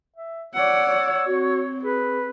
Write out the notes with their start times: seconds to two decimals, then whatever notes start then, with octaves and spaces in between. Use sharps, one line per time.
0.16 E5
0.54 C#5 D5 F#5 E6
0.86 C#5
1.27 C4 F#4
1.83 G#4 B4